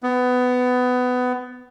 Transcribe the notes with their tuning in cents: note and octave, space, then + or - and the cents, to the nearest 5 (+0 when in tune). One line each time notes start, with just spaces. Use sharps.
B3 +20